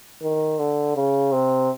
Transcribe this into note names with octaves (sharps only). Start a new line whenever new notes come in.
D#3
D3
C#3
C3